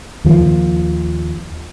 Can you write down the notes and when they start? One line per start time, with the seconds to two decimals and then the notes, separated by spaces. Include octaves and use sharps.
0.24 D#2 D#3 F3